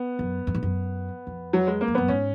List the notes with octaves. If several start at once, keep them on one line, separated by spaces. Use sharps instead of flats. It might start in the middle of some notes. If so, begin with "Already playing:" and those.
Already playing: B3
F#2
F#2
G#2
F#2
F2
F#3
G#3
A#3
F2
F#2 B3
G#2 C#4